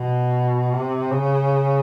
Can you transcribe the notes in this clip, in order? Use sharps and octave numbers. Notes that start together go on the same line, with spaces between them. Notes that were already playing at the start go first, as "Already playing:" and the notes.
Already playing: B2
C3
C#3